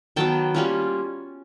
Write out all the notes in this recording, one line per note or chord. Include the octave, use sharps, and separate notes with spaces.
D#3 F#3 B3 G5 A5
G3 A#3 C#4 F4